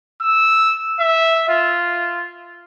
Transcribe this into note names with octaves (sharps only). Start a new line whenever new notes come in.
E6
E5
F4